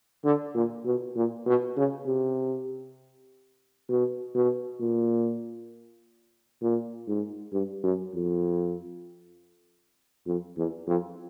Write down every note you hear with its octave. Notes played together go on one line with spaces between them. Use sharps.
D3
A#2
B2
A#2
B2
C#3
C3
B2
B2
A#2
A#2
G#2
G2
F#2
F2
F2
E2
F2